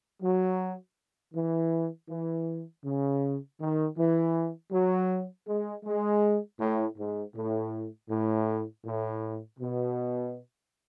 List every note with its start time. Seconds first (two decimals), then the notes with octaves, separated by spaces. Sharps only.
0.21 F#3
1.33 E3
2.09 E3
2.84 C#3
3.59 D#3
3.96 E3
4.71 F#3
5.47 G#3
5.84 G#3
6.59 A2
6.97 G#2
7.34 A2
8.09 A2
8.85 A2
9.60 B2